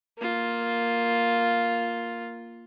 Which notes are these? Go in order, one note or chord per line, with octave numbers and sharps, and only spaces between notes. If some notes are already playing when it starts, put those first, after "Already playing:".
A#3 F4